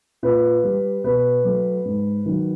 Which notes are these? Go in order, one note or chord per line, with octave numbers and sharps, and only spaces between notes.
A#2 B4
G3
B2 B4
F#3 A3
G#2
D#3 F#3